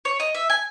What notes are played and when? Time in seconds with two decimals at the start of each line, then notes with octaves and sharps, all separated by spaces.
0.05 C#5
0.20 D#5
0.34 E5
0.50 G#5